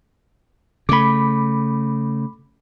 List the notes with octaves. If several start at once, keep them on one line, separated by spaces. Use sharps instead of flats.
C#3 A3 B5 D6